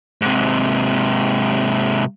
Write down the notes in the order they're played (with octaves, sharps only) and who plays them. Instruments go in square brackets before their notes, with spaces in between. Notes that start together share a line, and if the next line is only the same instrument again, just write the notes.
[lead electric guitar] G#2 C3